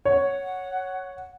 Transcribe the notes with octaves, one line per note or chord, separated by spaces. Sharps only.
C#5 F#5